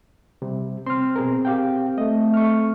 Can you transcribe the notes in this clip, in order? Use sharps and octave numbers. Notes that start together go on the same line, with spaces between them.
C3 G3
C4 C6 F6
B2 G#4 A#4
G4 F5 G5
A3 D#5
C#6 F6